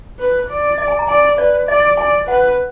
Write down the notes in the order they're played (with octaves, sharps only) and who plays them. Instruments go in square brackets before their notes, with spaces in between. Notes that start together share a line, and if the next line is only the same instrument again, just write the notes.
[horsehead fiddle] B4
D5
[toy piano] D#5
G#5
A#5
[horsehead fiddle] D5 [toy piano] G#5
[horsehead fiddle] B4 [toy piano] D5
[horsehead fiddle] D5 [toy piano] D#5
[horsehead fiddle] D5 [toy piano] G#5
[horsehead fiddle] B4 [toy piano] F#5